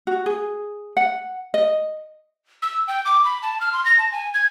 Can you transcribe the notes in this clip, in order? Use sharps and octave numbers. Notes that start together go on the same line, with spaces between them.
F#4
G#4
F#5
D#5
E6
G5
D6
B5
A5
F6
C6
A#6
A5
G#5
G#6